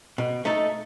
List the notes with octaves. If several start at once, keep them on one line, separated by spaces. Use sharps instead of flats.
B2
A3 D#4 A4